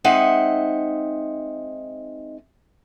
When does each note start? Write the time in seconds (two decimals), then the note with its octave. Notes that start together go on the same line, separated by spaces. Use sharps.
0.04 G#3 C4 D#4 D#5 E5 F#5